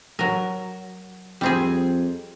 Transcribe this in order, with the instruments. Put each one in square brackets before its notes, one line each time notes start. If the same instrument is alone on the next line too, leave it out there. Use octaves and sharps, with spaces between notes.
[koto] F#3 A#4
[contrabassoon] F2 [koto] G3 C4 G#4